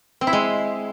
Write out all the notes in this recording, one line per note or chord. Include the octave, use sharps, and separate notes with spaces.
C4
E4
G#3